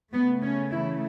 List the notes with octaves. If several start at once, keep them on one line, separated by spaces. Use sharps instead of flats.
C#3 A3 B3
C#4
E3 E4